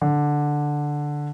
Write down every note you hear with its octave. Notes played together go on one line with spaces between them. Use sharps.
D3